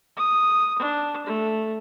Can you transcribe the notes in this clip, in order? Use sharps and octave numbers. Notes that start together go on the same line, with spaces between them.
D#6
D4
A3